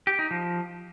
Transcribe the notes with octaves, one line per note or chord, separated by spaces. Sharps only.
G4
D#4
F3